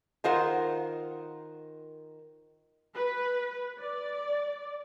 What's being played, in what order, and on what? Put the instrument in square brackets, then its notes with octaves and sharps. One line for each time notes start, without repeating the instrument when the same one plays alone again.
[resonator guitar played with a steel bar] D#3 F4 A#4 C5 F#5
[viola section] B4
D5